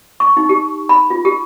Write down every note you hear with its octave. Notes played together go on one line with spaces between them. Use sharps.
C#6
D#4
G4
B5
F4
G4